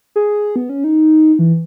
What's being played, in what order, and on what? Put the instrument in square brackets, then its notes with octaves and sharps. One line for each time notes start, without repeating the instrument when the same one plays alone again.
[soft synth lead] G#4
B3
C#4
D#4
E3